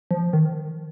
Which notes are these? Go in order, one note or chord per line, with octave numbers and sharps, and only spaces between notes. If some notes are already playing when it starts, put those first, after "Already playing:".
F3
D#3